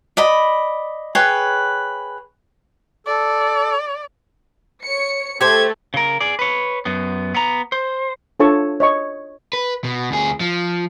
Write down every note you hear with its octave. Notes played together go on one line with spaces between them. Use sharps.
D5 D#5 B5
G#4 B4 C#5 G5
A4 D5
C#5 C#7
A3 G4 A4 C5 G#6
C#3 A#4
G#4 D5
B4 C#5
F#2 B3
B3 A#5
C5
D4 F4 A4 C#5 A5 C#6
C#5 D#5 C#6
B4
B2
D2 G#4
F3